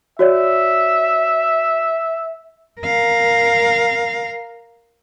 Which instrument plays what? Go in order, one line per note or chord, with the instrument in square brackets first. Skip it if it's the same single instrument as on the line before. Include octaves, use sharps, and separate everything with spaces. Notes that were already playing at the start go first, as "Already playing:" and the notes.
[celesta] F#4 C#5 D5 [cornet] E5
[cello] A#4 F5